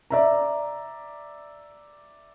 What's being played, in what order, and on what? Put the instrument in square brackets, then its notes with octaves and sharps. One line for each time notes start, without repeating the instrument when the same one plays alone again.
[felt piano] D5 E5 A#5